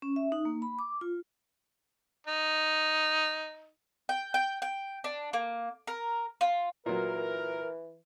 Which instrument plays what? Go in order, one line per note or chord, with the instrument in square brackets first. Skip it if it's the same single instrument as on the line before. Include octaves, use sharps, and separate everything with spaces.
[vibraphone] C#4
E5
D#4
A#3
B5
D6
F4
[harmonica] D#4
[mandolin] G5
G5
G5
D4
A#3
A#4
F4
[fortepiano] A#2 F#3 [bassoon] E3 [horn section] A#4